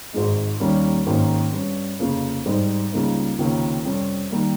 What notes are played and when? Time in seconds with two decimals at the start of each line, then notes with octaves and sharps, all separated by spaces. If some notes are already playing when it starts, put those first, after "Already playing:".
0.13 G#1 G#2 F3 G#3 D#4
0.60 D#2 D#3 G3 A#3 C#4
1.06 G#1 G#2 D#3 A#3 C#4
1.53 G2 G3 C#4
1.99 F1 F2 C#3 F3 A#3
2.46 G#2 G3 C4 D#4
2.92 C#2 C#3 G3 A#3 D#4
3.38 C#2 C3 D#3 A#3 C#4
3.85 F2 C3 G3 C#4
4.31 D#3 G3 A#3